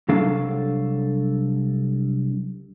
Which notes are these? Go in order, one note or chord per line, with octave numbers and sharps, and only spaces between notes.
C2 F#3 D4 A4 F5